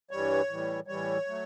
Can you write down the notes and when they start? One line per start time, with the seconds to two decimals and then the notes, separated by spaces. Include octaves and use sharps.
0.11 G2 E3 G3 C#5
0.49 A2 E3 G3
0.87 A2 E3 G3 C#5
1.27 F#3 A3